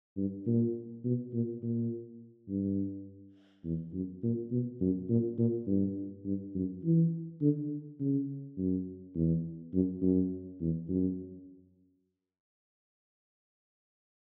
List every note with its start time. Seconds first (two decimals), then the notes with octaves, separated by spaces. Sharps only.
0.17 G2
0.46 A#2
1.04 B2
1.33 A#2
1.63 A#2
2.49 G2
3.65 E2
3.93 F#2
4.23 A#2
4.51 B2
4.81 F#2
5.09 A#2
5.38 A#2
5.67 G2
6.26 G2
6.55 F#2
6.84 E3
7.41 D3
8.00 C#3
8.58 F#2
9.15 E2
9.74 F#2
10.02 F#2
10.61 E2
10.89 F#2